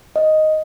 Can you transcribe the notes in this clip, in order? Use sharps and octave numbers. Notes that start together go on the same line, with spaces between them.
D#5